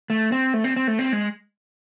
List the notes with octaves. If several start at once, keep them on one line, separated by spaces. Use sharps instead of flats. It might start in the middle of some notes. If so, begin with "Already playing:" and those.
A3
C4
A3
C4
C4
A3
C4
G#3